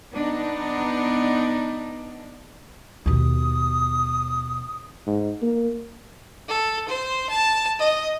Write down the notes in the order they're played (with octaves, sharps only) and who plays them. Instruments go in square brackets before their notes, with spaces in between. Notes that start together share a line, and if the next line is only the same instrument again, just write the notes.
[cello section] B3 D4 D#4
[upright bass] D#2 B2 [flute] D#6
[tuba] G#2
A#3
[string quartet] A4
C5
A5
D#5